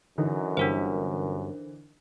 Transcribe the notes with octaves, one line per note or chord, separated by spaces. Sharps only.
F#2 D3 E3 D#4
G1 D4 A#4 C5